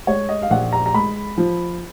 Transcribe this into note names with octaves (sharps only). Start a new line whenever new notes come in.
G#3 C#5
D#5
F5
A#1 F#5
A#5
A#5
G#3 B5
F3